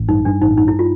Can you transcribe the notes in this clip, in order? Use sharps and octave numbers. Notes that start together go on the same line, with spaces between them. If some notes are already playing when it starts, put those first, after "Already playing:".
Already playing: A1
G2 D#4
G2 D4
A1 D#4
G2 D#4
E4
F4